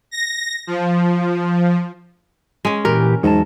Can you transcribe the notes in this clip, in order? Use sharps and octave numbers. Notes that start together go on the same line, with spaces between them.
A#6
F3
G#3 C#4
A#2 E3 G4 A#4
E2 G#2 F#3 A5